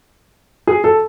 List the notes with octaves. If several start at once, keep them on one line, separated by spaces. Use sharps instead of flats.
G#4
A4